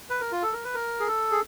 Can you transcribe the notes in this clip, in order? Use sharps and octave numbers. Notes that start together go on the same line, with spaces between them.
B4
A#4
F4
A4
A#4
B4
A#4
G#4
A4
G#4